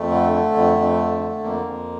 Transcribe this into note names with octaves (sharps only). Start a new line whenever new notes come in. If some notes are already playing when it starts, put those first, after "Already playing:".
Already playing: F2 A3
D3
D3
F2
F2
D3
D3
F2 A#3
F2